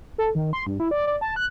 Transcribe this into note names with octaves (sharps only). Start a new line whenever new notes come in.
A4
D#3
C6
G2
E4
D5
D5
A5
F#6